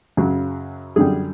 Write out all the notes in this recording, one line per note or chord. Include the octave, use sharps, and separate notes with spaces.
F#2 C#3 F#3
F#2 D3 G3 G#4